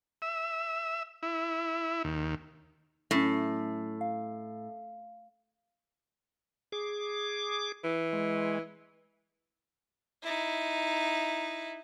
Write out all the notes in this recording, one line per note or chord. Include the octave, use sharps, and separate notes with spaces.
E5
E4
D#2
A2 F#3 C#4
F5
G#4 D6
E3
G#3
D#4 E4